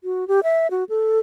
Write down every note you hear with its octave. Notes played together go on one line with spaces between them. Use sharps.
F#4
G4
E5
F#4
A4